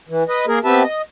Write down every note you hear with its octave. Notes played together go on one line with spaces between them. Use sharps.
E3
B4 D#5
A#3 G#4 A#4
B3 C4 G4 B4 E5 A5
D#5